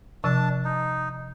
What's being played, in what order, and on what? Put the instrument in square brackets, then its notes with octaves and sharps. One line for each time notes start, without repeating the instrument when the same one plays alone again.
[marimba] C3 F3 E6 [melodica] D4 A5
[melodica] D#4